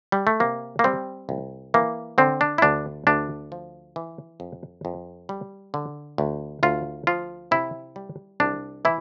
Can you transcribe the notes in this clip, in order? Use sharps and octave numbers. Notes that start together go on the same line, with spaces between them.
G3
A3
C3 A#3
A#3
G3 C4
C2
E3 A#3
D3 C4
D4
E4
D2 D4
D2 D4
F3
E3
F2
F2
G3
D3
D2
D2 F4
F3 F4
C3 E4
G3
C2 D4
E3 E4